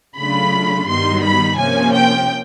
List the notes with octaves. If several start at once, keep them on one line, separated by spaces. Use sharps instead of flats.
C#3 F#3 A3 D4 F4 B5
G2 D#3 G3 B3 D#4 C6
B5
C3 F3 A#3 C#4 G#5
G5